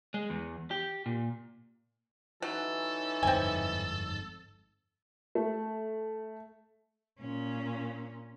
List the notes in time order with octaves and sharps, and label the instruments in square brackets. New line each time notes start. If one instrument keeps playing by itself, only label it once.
[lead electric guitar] G#3
E2
G4
A#2
[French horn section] E3 C#4 D#4 [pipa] F#3 [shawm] A4
[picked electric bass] G1 F2 G#2 [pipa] C4 G#5
[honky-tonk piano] A3
[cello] A#2 C#4